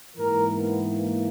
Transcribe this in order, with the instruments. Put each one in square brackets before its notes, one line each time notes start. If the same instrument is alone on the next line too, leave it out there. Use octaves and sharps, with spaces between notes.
[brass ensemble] G#2 E3 A#3 A#4
B3
A#3